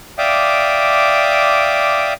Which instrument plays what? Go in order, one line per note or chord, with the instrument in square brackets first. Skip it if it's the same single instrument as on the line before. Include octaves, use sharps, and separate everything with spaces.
[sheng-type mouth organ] D5 E5 F5 G5 D6 D#6